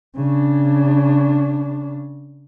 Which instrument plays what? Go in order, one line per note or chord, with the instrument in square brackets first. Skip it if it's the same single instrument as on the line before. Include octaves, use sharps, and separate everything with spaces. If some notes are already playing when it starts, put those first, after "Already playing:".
[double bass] C#3 D4